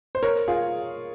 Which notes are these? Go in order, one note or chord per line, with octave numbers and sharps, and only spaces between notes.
C5
A#4 C#5
F4 G#4